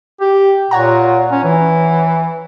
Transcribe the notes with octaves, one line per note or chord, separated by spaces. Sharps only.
G4
A#2 C#5 F#5 A#5
C#4
E3